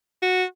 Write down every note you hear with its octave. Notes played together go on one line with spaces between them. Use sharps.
F#4